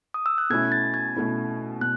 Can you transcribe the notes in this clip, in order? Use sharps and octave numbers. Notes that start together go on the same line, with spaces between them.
D#6
E6
F#6
B2 A3 C#4 E4 G#6
A6
G#6
B2 A3 C#4 E4
B2 F#6